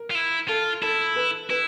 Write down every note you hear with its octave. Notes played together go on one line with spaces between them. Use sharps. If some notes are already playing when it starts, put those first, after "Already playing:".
Already playing: A#4
F4
E4
F4 A4
E4 A4
B4
E4 B4